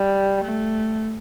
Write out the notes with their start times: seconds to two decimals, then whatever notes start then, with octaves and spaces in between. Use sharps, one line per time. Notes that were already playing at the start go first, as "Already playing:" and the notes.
Already playing: G3
0.44 A3